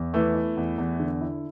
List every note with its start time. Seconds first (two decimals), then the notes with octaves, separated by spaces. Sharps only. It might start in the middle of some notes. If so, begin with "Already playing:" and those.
Already playing: E2
0.13 E3 A3 B3
0.35 E4
0.57 E2
0.78 E2
1.00 D3
1.21 E4